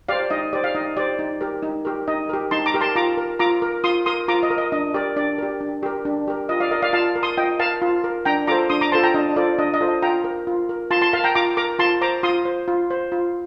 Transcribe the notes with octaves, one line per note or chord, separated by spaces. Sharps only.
G4 C5 D5 F5
D#4 D#5
G4 C5 D5
F5
D#4 D#5
G4 C5 D5
D#4
G4 A#4
D#4
G4 A#4
D#4 D#5
G4 A#4
D#4 A5 C6
A#5 D6
G4 A#4
A5 C6
F4 A#5 D6
A#4
F4 A#5 D6
A#4
F4 C6 D#6
A#4 C6 D#6
F4 A#5 D6
D#5
A#4
D#5
D4 D#5
G4 A#4 D5
D4 D5
G4 A#4
D4
G4 A#4
D4
G4 A#4
F4 D#5
D5 F5
A#4 D#5
D5 F5
F4 F5 A5
A#4
C6 D#6
F4 D#5 G5
A#4 F5 A5
F4
A#4
D4 G5 A#5
F4 A4 C5 A#5 D6
D4 C6 D#6
A#5 D6
F4 A4 C5 A5 C6
G5 A#5
D4 D#5
F4 A4 C5 D5
D4 D#5
D#5
F4 A4 C5
D#5
F4 G5 A#5
A#4
F4
A#4
F4 A5 C6
A5 C6
A#4 F5 A5
G5 A#5
F4 A#5 D6
A#4 A#5 D6
F4 A5 C6
C5 A#5 D6
F4 C6 D#6
C5
F4
C5
F4